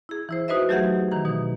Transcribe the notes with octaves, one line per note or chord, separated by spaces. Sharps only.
E4 G#4
E3 E4 C5
D#4 F#4 B4 C5 D#5 E5
F#3 A3 G4 G#4 E5 F#5
D#3 E3 A#5
B2 E3 D#4